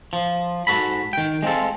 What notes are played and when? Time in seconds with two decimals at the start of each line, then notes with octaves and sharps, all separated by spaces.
0.13 F3
0.67 G#2 C3 F#4 A4 B5
1.13 D#3 G5
1.43 G#3 C4 F4 A4